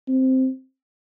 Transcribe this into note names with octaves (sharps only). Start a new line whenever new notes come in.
C4